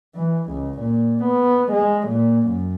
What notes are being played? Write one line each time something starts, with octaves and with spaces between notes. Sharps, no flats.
E3
C#2
A#2
B3
G#3
A#2
F#2